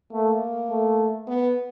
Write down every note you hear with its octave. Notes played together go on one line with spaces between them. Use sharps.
A3 A#3
A3
B3